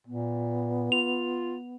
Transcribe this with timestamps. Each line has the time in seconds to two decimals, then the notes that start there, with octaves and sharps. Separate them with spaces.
0.07 A#2 B3
0.92 F4 F7